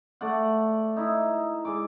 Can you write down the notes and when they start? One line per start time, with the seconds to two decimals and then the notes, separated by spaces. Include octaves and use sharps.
0.21 A3 D5 F#5
0.97 D#4 E4
1.65 G#3 D5 G#5 D6